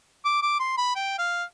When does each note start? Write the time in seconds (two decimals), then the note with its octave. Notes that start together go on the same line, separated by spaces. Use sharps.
0.25 D6
0.42 D6
0.60 C6
0.78 B5
0.96 G5
1.19 F5